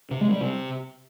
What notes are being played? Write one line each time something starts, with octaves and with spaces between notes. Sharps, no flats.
C3
G#3
G3
C3